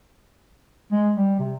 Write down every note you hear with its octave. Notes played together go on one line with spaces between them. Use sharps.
G#3
G3
C3